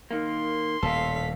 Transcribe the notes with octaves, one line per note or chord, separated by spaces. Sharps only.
D#3 A#3 C6
D#1 A2 A4 F5 B6